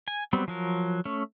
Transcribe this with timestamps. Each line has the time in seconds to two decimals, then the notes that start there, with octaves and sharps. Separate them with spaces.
0.08 G#5
0.33 F#3 G3 B3 C4
0.48 F3 F#3 A#4
1.05 A3 C#4